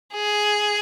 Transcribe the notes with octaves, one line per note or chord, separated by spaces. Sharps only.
G#4